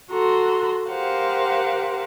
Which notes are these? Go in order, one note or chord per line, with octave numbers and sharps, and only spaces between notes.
F#4 A4 A#5 C6
G4 A#4 C5 F5 F#5